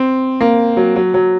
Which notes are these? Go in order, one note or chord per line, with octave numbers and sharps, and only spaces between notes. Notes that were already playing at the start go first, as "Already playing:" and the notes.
Already playing: C4
A#3
F#3
F#3
F#3